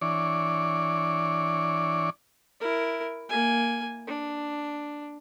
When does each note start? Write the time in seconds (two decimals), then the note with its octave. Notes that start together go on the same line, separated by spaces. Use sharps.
0.01 E3 D4 C#5 D5
2.61 E4 A#4
3.29 A#3 G#5
4.07 D4